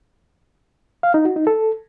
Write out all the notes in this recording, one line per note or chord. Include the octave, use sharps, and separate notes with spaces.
F5
D#4
F#4
D#4
A4